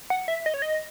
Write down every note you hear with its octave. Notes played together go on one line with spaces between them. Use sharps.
F#5
E5
D#5
C#5
D#5